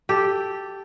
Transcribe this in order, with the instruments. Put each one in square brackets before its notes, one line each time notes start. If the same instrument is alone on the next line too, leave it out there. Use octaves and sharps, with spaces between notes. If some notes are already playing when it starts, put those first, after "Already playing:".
[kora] G4 A4